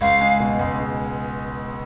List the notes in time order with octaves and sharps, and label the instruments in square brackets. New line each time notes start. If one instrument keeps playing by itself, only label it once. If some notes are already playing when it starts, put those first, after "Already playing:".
[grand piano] C#2 [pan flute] F5
[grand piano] G#3
B2
C#2
G#3